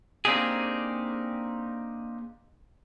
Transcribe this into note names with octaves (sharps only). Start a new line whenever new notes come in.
A#3 C4 D4 D#4 G4 G#4